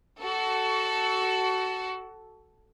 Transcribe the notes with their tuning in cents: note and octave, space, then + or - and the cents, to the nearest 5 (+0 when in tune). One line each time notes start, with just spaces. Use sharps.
F#4 +20 A4 +0